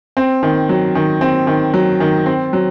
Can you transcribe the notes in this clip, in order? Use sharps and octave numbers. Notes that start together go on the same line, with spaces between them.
C4
D#3
F#3
D#3
C4
D#3
F#3
D#3
C4
F#3